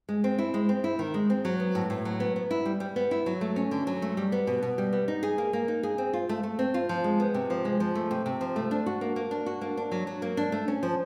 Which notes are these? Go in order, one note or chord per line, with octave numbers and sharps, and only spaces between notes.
G#3
C4
E4
G#3
C4
E4
D#3
G#3
C4
F#3
B3
A2
A2
F#3
B3
B3
E4
G3
G3
B3
E4
F#3
A3
C#4
D3
F#3
A3
G3
B3
B2
B2
G3
B3
D#4
G#4
A#3
A#3
D#4
G#4
C4
F4
A3
A3
C4
F4
F3
G#3
B3
C3
F3
G#3
F3
A3
C3
C3
F3
A3
D4
F#4
A#3
A#3
D4
F#4
A#3
D4
F#3
F#3
A#3
D4
A3
C#4
F3